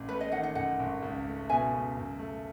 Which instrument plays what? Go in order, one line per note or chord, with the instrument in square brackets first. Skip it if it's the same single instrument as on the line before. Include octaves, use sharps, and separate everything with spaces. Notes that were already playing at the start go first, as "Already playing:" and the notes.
Already playing: [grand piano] A1
[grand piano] A3 [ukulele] B4
[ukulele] B4 D#5
[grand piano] D#3 [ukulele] D#5 F#5
[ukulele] D#5 F#5
[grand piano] F#2 [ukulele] D#5 F#5
[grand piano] G#1
C#2
A3
[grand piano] B2 [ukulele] E5 G#5
[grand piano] C#2
F#2
A3